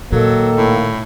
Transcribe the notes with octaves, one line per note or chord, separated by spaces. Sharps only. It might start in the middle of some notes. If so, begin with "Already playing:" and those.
A#2 D#3 F#3 A#3 A4
A2